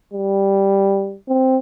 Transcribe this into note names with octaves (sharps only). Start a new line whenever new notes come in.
G3
C4